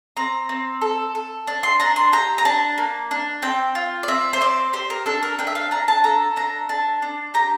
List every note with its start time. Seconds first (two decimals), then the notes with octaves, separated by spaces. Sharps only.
0.17 C4 A#5
0.49 C4
0.81 A4
1.15 A4
1.47 D4
1.63 C6
1.80 D4 A#5
1.96 C6
2.13 G4 A#5
2.38 A#5
2.45 D4 A5
2.78 A#3
3.11 D4
3.42 C4 G5
3.75 F4
4.03 D5
4.08 C4 E5
4.33 C5
4.41 C4 D5
4.73 G4 C5
4.90 A#4
5.06 D4 A4
5.23 A#4
5.39 D4 G5
5.47 E5
5.55 F5
5.71 D4 A#5
5.88 A5
6.04 A4 A#5
6.36 D4 A#5
6.69 D4 A5
7.02 D4
7.34 G4 A#5